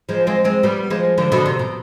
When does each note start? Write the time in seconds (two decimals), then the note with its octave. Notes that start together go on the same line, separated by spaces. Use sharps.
0.09 F3 G#3
0.27 G#3 C4
0.44 G#3 C4
0.63 G3 B3
0.90 F3 G#3
1.18 D3 F3
1.32 B2 D3
1.46 C3
1.59 B2